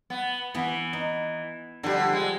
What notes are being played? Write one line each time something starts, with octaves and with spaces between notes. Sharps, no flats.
B3
E3 B3
D#4
D3 F3 G3
G#3